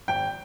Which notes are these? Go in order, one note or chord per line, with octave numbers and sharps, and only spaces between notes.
G#1 G5